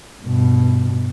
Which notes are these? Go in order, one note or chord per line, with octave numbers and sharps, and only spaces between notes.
G2 B2